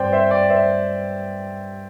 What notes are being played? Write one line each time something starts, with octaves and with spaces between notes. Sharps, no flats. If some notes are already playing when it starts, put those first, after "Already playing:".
Already playing: G2 G3 C4 C5 D5 G5
C5 E5
D5 G5
C5 E5